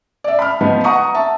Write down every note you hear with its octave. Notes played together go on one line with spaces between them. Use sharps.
D5 E5
B5 F6
F3 B3 D#4 F4
F#5 A#5 C#6 D#6
E5 A5